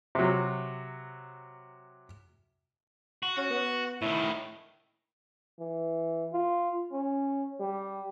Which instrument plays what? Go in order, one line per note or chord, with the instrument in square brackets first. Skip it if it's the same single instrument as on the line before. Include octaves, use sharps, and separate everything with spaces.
[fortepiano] C3 F#3
[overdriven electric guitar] F#4
[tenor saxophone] C#4 [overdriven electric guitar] F#4
[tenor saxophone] B3
[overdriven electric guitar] A2 D#3 [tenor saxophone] E4
[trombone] E3
F4
C#4
G3